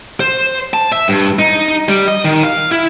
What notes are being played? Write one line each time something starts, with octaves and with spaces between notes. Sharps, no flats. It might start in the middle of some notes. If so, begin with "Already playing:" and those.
C5
A5
E5
G2
D#4
G3
D#5
D#3
F5
E4